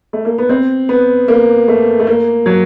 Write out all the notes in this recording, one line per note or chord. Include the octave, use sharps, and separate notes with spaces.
A3
A#3
B3
C4
B3
A#3
A3
A3
A#3
F#3